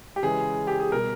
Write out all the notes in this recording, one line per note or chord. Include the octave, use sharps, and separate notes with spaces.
G4
C#3 E3 G#3 G#4
G4
G#4
B2 G3 A#4